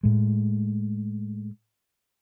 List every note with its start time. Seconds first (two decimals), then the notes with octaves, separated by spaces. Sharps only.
0.03 A2 G#3